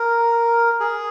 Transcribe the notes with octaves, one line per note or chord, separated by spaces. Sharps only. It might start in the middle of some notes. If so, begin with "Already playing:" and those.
Already playing: A#4
G#4